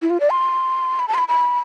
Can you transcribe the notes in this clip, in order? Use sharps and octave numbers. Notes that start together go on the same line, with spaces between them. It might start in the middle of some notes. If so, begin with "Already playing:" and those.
E4
F4
D5
C6
B5
A5
C6
B5
B5